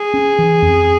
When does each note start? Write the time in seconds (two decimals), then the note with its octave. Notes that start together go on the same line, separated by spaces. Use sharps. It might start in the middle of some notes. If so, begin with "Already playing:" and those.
Already playing: G#4
0.14 C#4
0.39 E3
0.62 F2